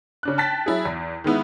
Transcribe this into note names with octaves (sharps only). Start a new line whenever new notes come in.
C#3 D4 F#6
G5 A5 F#6 A6 B6
F#3 E4 G#4
E2
D#3 G#3 B3 E4